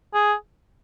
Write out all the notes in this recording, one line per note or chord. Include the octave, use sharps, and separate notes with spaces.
G#4